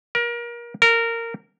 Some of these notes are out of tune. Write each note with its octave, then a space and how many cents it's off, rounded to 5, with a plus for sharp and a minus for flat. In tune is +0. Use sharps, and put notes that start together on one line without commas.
A#4 +30
A#4 -15